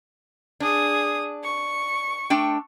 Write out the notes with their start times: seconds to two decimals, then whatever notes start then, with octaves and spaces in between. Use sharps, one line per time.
0.60 D4 G#4 D#6
1.43 C#6
2.30 A3 D4 G5